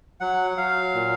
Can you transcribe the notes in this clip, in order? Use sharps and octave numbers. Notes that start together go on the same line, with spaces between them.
F#3 F#5
F#3 F5
A#2